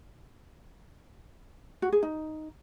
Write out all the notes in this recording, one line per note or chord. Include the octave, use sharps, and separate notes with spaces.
F#4
G#4
D#4